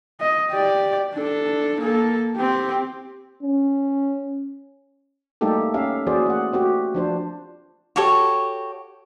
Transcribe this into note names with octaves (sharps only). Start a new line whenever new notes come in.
D#5
G4 D5
D4 A4
A#3 A4
C4 G4
C#4
G3 A3 A#3 D#4 G4 A4
C#4 G4 E5 F5
E3 A#3 F#4 G#4 C5 D5
A3 F#5
A3 C4 F#4 G4
F3 D4 C5
F#4 G4 A4 C#5